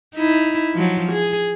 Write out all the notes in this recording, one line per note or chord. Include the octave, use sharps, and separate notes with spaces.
D#4 E4
F3 F#3
G#4